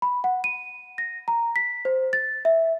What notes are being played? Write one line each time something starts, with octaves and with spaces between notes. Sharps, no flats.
B5
F#5
D#7
A#6
A#5
B6
C5
A6
E5